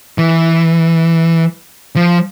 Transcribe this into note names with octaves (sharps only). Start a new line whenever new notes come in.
E3
F3